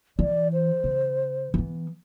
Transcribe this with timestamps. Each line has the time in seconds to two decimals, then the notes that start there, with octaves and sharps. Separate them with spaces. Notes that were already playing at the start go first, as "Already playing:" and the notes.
0.19 E3 D5
0.53 C5
0.84 C#3
1.54 E3 B3